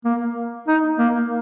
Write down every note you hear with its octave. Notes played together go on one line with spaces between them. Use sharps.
A#3
D#4
A#3